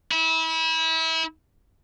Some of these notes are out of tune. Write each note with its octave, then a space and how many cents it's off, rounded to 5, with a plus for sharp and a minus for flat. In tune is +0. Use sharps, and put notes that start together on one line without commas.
E4 -30